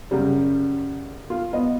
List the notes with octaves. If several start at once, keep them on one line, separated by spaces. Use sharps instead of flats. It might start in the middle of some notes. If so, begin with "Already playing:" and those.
F#2 C#3 G3
F4
B3 D#5